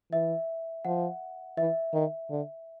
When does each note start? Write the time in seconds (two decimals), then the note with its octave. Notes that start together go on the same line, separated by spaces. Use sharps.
0.12 E3 E5
0.85 F3 F#5
1.57 E3 E5
1.94 D#3
2.30 D3